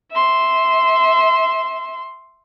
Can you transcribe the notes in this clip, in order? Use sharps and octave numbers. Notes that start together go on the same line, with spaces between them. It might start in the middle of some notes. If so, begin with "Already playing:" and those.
E5 C6